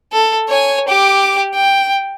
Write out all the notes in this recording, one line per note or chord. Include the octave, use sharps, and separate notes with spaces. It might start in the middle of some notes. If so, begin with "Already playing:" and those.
A4
C#5 G#5
G4 D6
G5